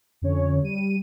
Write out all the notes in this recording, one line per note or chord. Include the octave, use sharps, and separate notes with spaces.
F2 D3 C#4 C#5
G3 D#7